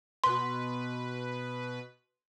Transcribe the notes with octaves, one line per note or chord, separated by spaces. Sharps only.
B2 B4 C6